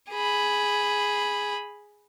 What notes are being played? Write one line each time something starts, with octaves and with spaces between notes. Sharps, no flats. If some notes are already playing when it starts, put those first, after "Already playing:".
G#4 B5